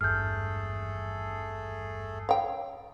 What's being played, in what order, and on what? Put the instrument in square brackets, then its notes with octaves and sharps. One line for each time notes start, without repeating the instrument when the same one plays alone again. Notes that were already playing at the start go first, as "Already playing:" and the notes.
[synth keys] G#1 E2 G2 [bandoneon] A3 G#4 A4 [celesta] F6 G6
[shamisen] C#5 G5 [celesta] F5